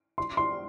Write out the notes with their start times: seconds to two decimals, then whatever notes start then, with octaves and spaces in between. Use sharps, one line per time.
0.18 C6
0.37 C6